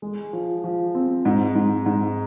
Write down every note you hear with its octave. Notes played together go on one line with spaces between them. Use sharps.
G#3
F3
F3
C4
G#2
G#2
G#2